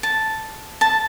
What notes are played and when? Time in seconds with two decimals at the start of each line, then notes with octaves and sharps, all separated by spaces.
0.03 A5
0.81 A5